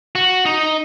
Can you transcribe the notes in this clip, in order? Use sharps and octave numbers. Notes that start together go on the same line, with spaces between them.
F#4
D#4